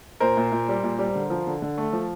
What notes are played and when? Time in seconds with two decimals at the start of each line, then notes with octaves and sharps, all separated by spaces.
0.20 A#2 A#4 C5
0.37 A#2
0.52 A#2
0.69 G3
0.83 A#2
0.99 G3
1.15 D3
1.30 F3
1.47 D3
1.62 D3
1.78 A3
1.93 F3